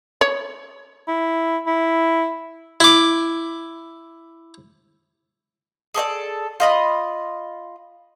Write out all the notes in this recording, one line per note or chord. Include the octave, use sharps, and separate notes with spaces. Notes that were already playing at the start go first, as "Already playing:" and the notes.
C#5
E4
E4
E4 D6
G#4 A4 C#5 D5
F4 D#5 B5